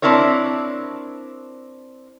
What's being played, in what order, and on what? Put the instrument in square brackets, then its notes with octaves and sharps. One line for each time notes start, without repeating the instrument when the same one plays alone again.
[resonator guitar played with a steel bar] C4 D4 E4 A#4 C#5